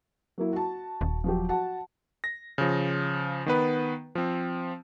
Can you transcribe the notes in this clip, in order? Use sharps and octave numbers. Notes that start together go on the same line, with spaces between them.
F#3 A#3 E4
F#4 A5
D#1
F3 F#3 G4
F#4 F#5 A5
A#6
C#3 F3
D#3 B3 B4
F3 C4